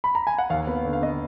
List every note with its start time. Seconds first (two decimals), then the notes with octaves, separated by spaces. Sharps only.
0.04 B5
0.15 A#5
0.27 G#5
0.38 F#5
0.50 D#2 F5
0.67 B3
0.85 D3
0.93 F5
1.02 B3 D#5